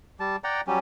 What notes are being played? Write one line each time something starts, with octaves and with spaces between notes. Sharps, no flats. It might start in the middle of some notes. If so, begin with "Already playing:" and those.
G3 A5
D5 F#5 G5 A#5
F#3 G3 C#4 G4